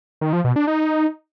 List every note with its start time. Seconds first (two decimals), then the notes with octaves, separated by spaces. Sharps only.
0.21 D#3
0.33 F3
0.44 B2
0.56 D4
0.67 D#4